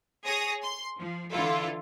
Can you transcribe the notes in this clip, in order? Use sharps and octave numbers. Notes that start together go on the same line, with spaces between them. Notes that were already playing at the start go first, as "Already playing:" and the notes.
G#4 C#5 D#6 A#6
C6
F3
D3 E3 E4 F4 A4